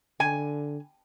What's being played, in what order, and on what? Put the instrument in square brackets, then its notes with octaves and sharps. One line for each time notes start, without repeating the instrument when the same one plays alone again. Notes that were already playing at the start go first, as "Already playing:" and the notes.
[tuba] D3 [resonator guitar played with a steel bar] G#5